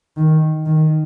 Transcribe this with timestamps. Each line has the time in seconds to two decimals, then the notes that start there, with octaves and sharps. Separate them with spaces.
0.17 D#3
0.66 D#3